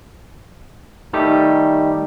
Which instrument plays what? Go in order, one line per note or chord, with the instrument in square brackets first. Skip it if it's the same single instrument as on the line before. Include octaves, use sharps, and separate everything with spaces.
[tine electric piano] D#3 G3 A3 D#4 G4 A4